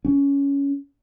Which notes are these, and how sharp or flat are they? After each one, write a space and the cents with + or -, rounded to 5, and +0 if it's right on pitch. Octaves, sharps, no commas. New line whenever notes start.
C#4 +15